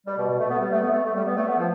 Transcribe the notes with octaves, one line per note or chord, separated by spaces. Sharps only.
G3
B2
B2
A3
B3
G3
A3
B3
A3
A3
G3
B3
A3
B3
F3